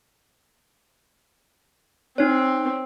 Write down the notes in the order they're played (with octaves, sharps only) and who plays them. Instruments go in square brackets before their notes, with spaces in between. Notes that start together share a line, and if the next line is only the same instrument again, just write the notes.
[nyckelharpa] C4 [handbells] D#4 C#5